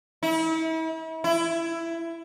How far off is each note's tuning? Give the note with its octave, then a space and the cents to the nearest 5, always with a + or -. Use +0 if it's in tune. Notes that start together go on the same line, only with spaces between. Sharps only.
E4 -40
E4 +15